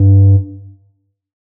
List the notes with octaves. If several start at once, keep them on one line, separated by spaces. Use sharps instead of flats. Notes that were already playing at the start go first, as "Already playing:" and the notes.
Already playing: G2